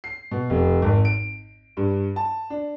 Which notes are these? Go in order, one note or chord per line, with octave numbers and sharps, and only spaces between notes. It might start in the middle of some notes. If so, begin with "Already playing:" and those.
C7
B2
F1
G#1
D7
G2
A5
D4